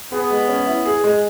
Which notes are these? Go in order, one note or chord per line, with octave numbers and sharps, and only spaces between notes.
B3 G#4
G#3
C#4
E4
G#4
G#3